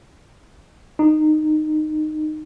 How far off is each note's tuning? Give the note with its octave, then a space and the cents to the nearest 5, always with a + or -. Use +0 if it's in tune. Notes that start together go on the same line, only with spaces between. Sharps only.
D#4 -15